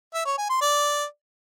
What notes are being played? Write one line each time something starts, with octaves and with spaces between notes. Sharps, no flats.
E5
C#5
G#5
C6
D5